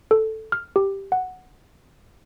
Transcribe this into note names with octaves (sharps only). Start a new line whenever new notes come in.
A4
F6
G4
F#5